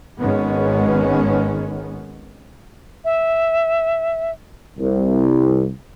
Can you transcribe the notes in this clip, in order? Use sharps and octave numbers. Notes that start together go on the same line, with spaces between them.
G#1 G#2 D#3 G#3 B3 C#4
E5
C2